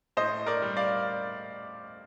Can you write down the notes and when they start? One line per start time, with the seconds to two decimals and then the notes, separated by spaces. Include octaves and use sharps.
0.17 A2 C5 D#5
0.46 A#4 D5
0.62 G3
0.77 D5 F5